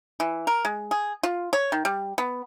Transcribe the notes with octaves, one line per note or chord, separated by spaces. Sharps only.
E3
A#4
G#3
G#4
F4
C#5
D#3
G3
B3